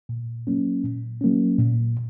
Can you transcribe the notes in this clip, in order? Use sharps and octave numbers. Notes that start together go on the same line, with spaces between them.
A#2
F#3 A#3 C#4
A#2
F#3 A#3 C#4
A#2